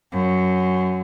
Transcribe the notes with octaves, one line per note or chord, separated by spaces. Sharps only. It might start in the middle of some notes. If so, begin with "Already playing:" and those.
F#2